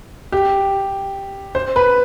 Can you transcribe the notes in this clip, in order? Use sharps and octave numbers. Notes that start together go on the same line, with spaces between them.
G4
C5
B4